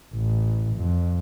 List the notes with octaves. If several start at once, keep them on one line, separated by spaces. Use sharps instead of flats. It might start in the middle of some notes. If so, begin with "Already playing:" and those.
A1
F2